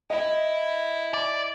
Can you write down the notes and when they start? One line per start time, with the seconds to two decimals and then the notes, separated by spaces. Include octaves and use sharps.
0.10 E4 D#5
1.14 D5